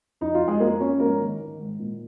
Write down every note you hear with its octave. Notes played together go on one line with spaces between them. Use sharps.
F2 D#4
F4
F2
G#3 G#4
F3 A#3 A#4
F3 C#4 C#5
G#2 A#3 A#4
D#3
D#3
G#2
A#2